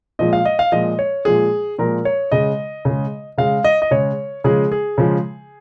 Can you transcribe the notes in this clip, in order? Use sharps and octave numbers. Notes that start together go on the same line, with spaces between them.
A#2 F3 G#3 D#5
F5
D#5
F5
A#2 F3 G#3 D#5
C#5
A#2 F3 G#3 G#4
A#2 F3 G#3 A#4
C#5
C#3 G#3 D#5
C#3 G#3
C#3 G#3 F5
D#5
D#5
C#3 G#3 C#5
C#3 F3 G#3 G#4
G#4
C#3 F3 G#3